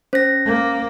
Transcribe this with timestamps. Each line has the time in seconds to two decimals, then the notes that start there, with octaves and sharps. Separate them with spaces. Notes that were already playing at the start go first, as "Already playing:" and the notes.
0.13 C#4 C5 A#6
0.46 A#3